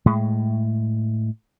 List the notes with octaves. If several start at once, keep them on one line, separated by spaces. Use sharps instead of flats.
A2 G#3